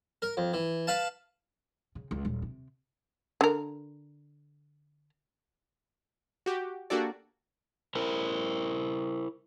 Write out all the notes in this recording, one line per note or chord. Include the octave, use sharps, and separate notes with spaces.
A#4
F2
E3
B4 F5 A5
C#3
C#2
D#1
C3
D3 A#4
F#4 G4
A#3 D4 F#4 G4 A4 D5
E4 A#4 C5